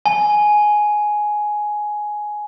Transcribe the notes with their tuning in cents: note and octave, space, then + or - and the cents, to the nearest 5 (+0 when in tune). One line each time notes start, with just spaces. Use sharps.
G#5 +10